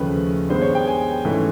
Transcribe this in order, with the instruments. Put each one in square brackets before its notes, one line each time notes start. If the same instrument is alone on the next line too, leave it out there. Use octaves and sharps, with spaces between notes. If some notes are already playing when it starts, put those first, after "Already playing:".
Already playing: [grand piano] D#2 C#3 F3 A3 C#4 B4
G2 D#3 G#3 B3 C5
C#5
G5
G#5
G#2 E3 A3 C#4